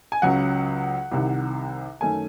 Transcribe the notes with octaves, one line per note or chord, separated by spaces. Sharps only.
G#5
C#2 C#3 F#3 F#5
C2 C3 D#3
F#2 D#3 A3 C#4 G#5